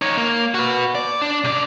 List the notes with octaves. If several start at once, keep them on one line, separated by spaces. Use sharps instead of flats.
D#4 C#5
A#3
F#4 B4
D5
D4
C3 D5